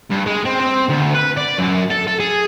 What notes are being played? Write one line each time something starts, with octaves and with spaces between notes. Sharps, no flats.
G2
G#3
C4
C4
D2
B4
D5
F#2
A4
A4
G#4